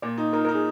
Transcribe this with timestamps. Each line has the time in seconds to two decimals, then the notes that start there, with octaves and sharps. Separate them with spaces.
0.02 A#2 D5
0.18 D#4
0.33 D#4 A#4
0.45 D#4 A#4
0.55 G#4